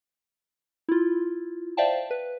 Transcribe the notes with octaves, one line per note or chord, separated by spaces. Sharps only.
E4 F4
C5 D5 E5 F5 G5 A5
B4